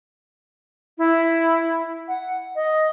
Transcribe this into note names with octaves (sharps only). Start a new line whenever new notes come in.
E4
F#5
D#5